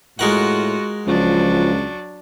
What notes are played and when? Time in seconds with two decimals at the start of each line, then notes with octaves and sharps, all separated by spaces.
0.19 A2 G#3 F4 F#4 A#4 F#5
1.07 C#2 F3 F#3 D4